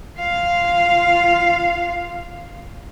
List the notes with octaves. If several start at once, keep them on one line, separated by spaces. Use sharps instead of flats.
F4 F5